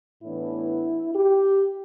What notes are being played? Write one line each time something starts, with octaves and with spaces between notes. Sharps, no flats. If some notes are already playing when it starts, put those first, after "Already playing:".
A2 E3 B3 D4 E4
G4